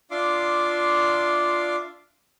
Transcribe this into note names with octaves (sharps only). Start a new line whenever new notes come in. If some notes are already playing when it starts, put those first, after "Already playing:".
D4 F4 E5 F5 C6 D6